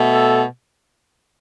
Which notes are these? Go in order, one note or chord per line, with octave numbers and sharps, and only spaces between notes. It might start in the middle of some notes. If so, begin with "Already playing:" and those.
Already playing: B2 A3
A4